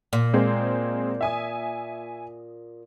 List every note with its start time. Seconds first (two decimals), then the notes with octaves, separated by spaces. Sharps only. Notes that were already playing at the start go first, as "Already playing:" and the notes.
0.13 A#2
0.34 G#3 A#3 C4
1.21 E5 G#5 D#6